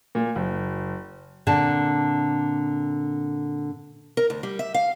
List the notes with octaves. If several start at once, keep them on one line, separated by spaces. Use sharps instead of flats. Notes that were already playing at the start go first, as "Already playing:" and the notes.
A#2
F#1
A#2 D3 C4 A5
A#4
D2
G3
E5
F5